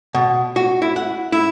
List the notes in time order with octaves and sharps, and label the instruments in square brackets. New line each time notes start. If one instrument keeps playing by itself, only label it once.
[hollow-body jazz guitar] B2
F#4
E4
F#5
E4